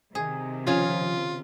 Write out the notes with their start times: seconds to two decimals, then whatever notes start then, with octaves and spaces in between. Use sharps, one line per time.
0.15 C3 D#3 G#4
0.67 C#3 F3 F4 G#4 F5